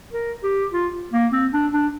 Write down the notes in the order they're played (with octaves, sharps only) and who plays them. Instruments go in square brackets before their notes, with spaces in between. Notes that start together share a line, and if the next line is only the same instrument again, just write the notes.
[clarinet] A#4
G4
F4
A#3
C4
D4
D4